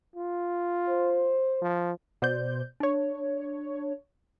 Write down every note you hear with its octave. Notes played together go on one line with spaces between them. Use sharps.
F4
C5
F3
B2 C5 D5 G6
D4 C#5